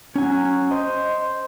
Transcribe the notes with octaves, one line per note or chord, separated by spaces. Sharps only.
F#3 C#4 G#5
C5 D#5